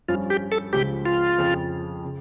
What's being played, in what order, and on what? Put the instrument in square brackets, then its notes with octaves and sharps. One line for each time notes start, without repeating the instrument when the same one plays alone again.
[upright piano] G2 F3 C#4 [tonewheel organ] F4
[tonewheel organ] G4
A4
[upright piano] C#2 C#3 F3 [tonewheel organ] G4
[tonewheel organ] F4
[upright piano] F2 C#3 F3
C#3